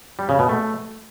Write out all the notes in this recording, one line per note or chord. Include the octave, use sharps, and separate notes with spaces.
G3
C#3
B2
A3